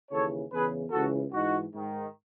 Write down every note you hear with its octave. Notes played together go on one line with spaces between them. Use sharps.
D#2 C#3 E3 A4 C#5
E2 C#3 E3 G#4 B4
C#2 C#3 E3 F#4 A4
G#2 E3 D#4 F#4
G#2 D#3